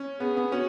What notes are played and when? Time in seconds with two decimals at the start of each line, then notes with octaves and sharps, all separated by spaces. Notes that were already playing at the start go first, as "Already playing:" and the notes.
Already playing: C#4
0.20 B3 G#4
0.37 B3
0.52 C#4 F#4